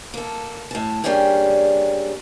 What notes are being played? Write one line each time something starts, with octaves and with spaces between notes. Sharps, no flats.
A#3 A4
A2 A5
G3 A#3 C#4 D4 G4 G#4